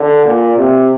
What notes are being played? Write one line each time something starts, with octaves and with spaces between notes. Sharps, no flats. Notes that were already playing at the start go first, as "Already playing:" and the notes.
Already playing: D3
A#2
C3